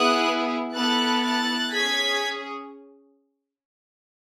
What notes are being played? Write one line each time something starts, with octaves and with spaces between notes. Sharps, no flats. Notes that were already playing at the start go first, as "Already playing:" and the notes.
Already playing: B3 E4 G#4 D#6 F#6
B3 E4 A4 F#6 A6
F#6 A6
C#4 G#4 G#6 B6